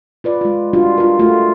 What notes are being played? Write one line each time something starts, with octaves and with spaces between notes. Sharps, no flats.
F4 B4 D5
G#3 F4
G3 D4 F4 F#4
F4 A#4
A3 F4 F#4